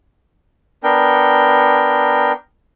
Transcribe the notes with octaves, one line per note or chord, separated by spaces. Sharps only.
B3 D4 A#4 G5